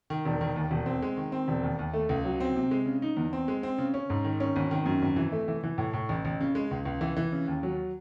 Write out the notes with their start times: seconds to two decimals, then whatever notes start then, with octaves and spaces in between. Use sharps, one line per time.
0.10 D#3
0.25 E1
0.41 D#3
0.56 D#2
0.71 E1
0.86 C4
1.02 G#3
1.17 D#3
1.32 C4
1.48 E1
1.63 D#2
1.79 D#2
1.93 A3
2.09 C#2
2.24 F#3
2.40 C4
2.56 C3
2.71 G#3
2.86 C#3
3.02 D#4
3.17 E2
3.33 C4
3.48 G#3
3.63 C4
3.78 C#3
3.94 C#4
4.10 G#2
4.24 D#3
4.40 C#4
4.56 G#1
4.71 D#3
4.86 F#2
5.02 G#1
5.16 E3
5.32 A3
5.48 E3
5.64 E3
5.78 A2
5.93 A2
6.09 A1
6.25 A1
6.41 C#3
6.55 G#3
6.71 C#2
6.85 C#2
7.01 E3
7.17 E3
7.32 C#3
7.48 D#2
7.63 F#3